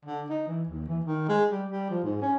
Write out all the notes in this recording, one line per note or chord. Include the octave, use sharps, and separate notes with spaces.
D3
D#4
E3
D#2
E3
D#3
G#3
G3
G3
F3
G#2
C#4